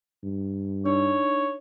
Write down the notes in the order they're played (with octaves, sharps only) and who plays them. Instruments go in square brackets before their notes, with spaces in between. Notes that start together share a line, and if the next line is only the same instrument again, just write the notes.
[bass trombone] G2
[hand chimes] D4 D#4 [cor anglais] C#5